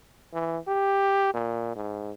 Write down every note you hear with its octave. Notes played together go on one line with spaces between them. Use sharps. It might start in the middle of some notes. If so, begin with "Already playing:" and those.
E3
G4
A#2
G#2